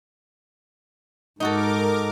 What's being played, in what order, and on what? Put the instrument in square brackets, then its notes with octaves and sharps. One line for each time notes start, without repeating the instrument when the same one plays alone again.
[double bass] G#2 [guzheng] D#4 F#4 A4 [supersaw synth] A#4 D6